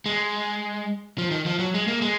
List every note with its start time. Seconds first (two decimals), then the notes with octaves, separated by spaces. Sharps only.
0.06 G#3
1.18 F3
1.31 D#3
1.46 F3
1.59 F#3
1.74 G#3
1.88 A#3
2.02 G#3